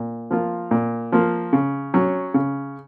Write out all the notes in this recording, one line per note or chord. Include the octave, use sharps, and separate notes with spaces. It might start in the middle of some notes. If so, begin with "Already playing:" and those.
Already playing: A#2
F3 A#3 F4
A#2
F3 A#3 F4
C#3
F#3 C#4
C#3